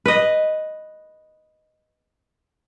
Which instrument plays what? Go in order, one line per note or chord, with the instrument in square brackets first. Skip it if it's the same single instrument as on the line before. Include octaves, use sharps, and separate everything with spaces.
[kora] B4 D#5